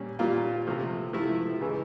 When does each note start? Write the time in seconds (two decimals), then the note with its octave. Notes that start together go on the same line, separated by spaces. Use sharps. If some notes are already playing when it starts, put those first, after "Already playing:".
Already playing: A#2 G3 C#4
0.19 A#2 G3 F4
0.67 C3 F3 A3
1.13 C3 F3 A3 E4
1.60 C#3 E3 G#3